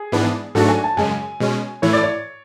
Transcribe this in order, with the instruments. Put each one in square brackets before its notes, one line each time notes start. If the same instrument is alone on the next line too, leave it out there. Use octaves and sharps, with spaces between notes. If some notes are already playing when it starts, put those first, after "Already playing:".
Already playing: [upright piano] G#4
[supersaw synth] G#2 E3 B3 D4
[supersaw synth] G#2 F#3 A3 D4 F#4 [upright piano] A4
[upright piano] G#5
A5
[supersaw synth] F#2 C#3 G#3 [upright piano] G#5
[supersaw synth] B2 G#3 C#4
[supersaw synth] A2 E3 A3 E4 [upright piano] C#5
[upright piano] D5
C#5